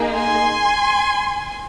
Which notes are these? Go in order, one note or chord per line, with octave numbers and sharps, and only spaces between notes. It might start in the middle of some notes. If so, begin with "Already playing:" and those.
Already playing: A#3 D#4 G#4
G#5 C6